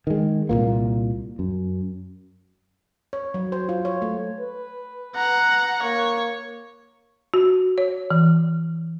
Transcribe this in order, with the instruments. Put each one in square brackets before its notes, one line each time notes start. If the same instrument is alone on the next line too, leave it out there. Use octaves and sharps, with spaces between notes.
[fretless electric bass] D#3 G#3
C2 F2 A#2 A#3
F#2
[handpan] C#5
F#3
C5
F4
C#5
A3
[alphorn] B4
[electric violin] F#5 A#5
[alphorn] A#3 [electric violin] C#5
[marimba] F#4
C#5
E3